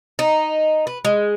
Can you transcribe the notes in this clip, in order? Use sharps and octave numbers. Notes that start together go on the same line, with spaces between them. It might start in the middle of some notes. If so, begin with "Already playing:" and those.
D#4
B4
G#3